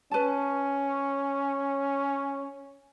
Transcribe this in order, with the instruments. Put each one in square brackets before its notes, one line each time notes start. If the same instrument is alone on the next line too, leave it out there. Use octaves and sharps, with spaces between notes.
[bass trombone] C#4 [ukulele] B4 A5